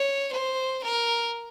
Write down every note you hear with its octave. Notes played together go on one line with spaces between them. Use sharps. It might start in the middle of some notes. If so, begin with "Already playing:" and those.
Already playing: C#5
C5
A#4